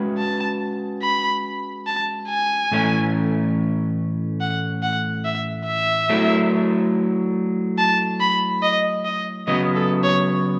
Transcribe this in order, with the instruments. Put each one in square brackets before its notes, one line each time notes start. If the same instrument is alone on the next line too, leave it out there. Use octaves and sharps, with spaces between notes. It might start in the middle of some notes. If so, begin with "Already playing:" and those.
Already playing: [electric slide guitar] G#3 C#4 F#4 B4
[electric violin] A5
B5
A5
G#5
[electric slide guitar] A2 E3 A3 C#4
[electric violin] F#5
F#5
E5
E5
[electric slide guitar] F#3 A3 E4
[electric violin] A5
B5
D#5
D#5
[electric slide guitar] C#3 F#3 B3 [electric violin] D#5
[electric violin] A4
C#5